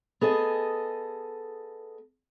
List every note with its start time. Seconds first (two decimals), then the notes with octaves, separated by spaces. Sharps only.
0.21 B3 G#4 A4 D#5